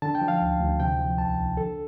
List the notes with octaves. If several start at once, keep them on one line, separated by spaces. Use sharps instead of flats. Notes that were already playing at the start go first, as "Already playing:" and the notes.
D3 A5
G5
F3
F5
D2
D2
C3 G5
F3
C2 A5
C2
D3 A4